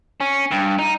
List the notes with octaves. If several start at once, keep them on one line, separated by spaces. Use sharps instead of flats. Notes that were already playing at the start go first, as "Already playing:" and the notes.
C#4
G2
D#4